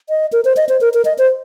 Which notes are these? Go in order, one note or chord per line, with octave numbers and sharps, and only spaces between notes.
D#5
A#4
C5
D#5
C5
A#4
A#4
D#5
C5